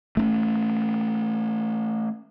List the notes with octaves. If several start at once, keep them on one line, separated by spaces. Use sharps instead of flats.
A3 C4 C#4